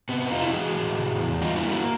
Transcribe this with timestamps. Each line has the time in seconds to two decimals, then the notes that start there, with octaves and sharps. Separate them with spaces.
0.09 C3 B3
0.20 B3
0.31 F2 D#4 F4
0.41 E4 F#4
0.53 E3 F#4 G#4
0.75 A2
0.98 C3
1.19 E2
1.41 G3 D#4 F4
1.56 E4 F#4
1.63 A#3
1.70 E4 F#4